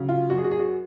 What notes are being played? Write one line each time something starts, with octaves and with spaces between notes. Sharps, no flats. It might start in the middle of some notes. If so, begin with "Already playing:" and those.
Already playing: C#3 F#3
F4
F#2 F#4
G#4
F#4
G#4
F#4